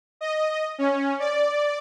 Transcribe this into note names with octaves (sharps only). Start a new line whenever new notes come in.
D#5
C#4
D5